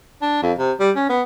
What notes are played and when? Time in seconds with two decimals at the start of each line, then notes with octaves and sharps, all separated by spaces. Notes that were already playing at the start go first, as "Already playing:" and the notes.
0.22 D4
0.42 F2
0.59 C3
0.80 G3
0.96 C#4
1.09 B3